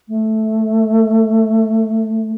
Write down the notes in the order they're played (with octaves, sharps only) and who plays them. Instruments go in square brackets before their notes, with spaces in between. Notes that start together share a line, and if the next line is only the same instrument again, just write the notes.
[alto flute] A3